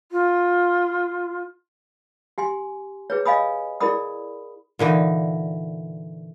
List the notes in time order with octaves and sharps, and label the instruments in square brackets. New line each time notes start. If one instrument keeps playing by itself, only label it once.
[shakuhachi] F4
[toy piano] G4 G#5 C6
G#4 B4 C#5
D#5 F5 G#5 B5 D#6
E4 G#4 A#4 D5 B5 D#6
[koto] A#2 D3 E3 D#4